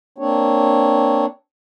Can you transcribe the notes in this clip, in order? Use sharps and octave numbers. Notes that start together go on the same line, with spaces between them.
A#3 C4 D4 C#5